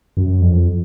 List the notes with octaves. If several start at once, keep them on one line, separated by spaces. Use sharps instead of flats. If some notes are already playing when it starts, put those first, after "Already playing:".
F#2
F2